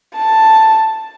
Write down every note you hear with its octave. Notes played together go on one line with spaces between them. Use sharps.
A5